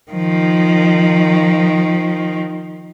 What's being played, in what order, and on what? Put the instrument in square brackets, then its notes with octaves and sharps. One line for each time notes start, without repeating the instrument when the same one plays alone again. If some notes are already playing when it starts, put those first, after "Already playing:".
[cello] D#3 F3